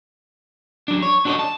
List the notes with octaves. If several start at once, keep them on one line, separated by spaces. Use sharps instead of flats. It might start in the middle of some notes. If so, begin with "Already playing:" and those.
F#3 D4
C#5
D4 F#4 A4 A#4 C#5 D#5
A5